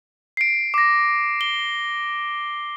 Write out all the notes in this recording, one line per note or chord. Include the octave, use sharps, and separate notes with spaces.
C7 D7
D6 A#6
G7